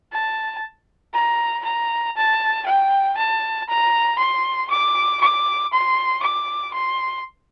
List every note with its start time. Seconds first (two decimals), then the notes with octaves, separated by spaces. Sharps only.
0.13 A5
1.14 A#5
1.65 A#5
2.16 A5
2.66 G5
3.17 A5
3.69 A#5
4.19 C6
4.71 D6
5.21 D6
5.73 C6
6.22 D6
6.74 C6